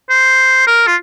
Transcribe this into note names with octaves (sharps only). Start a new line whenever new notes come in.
C5
A#4
F4